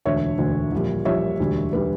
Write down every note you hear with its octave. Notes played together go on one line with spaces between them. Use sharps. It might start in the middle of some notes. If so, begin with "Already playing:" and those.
E1 D2 D3 C#5 E5
E1 D2 D3
A#1 A#2 G3
A#1 A#2 G3 C#5 E5
E1 D2 D3 G3
D3 G3 B4